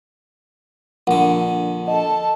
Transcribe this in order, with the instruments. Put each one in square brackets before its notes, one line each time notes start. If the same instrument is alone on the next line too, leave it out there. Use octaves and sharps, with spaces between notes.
[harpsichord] A#1 D3 [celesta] F#5
[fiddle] A4 A5 [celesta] D#5